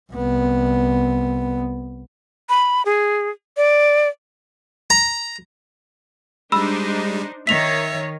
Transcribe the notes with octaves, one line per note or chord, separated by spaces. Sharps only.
C2 B3
B5
G#4
D5
A#5
G3 G#3 D4 D#4 C5 B5 E6
D#3 C#5 E5 B6 F7